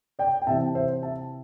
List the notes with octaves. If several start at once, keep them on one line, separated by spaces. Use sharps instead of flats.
D5 G5
G5
C3 E3 C4 E5 A5
C5 E5
E5 A5